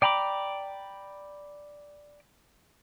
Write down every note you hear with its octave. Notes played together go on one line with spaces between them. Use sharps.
D5 G5 A#5 B5 D6